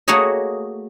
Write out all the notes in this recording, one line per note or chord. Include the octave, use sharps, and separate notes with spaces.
A3 A#3 F#4 G#4 C#5 D#5